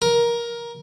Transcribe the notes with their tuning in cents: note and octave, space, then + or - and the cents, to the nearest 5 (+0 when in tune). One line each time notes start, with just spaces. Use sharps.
A#4 +15